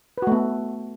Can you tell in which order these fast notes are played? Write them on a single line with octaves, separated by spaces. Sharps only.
B4 F#4 A3 B3